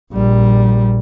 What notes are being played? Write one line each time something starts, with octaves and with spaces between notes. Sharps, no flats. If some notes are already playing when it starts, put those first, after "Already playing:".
A#1 G3